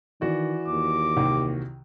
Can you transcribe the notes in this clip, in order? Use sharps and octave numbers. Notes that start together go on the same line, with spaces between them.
D#3 E3 F#4 D5
D#2 D6
C2 D#3